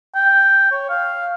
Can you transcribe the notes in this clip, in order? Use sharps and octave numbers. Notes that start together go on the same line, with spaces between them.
G5
C#5
F5